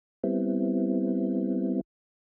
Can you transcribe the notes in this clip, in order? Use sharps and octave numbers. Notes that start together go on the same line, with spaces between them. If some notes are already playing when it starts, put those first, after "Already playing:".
G3 B3 C4 E4